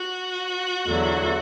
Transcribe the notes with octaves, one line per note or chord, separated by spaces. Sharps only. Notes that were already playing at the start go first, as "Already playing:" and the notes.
Already playing: F#4
E2 D3 F#3